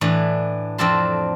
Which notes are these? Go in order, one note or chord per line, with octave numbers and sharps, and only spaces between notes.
A2 E3 D4
F2 C4 D4 A4 A5 C6